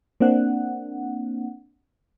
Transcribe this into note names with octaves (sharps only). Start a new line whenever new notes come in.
A#3 C4 D4 F#5